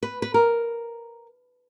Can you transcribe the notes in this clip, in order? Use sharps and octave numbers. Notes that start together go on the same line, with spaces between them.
B4
B4
A#4